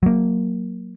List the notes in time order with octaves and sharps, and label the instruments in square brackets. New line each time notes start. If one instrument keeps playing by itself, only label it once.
[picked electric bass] F#3 A#3